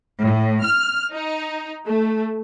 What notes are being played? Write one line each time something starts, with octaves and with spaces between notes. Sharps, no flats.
A2
F6
D#4
A3